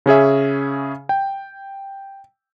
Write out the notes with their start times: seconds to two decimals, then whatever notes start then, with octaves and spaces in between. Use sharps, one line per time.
0.06 C#3 C#4 G#4 E5
1.09 G5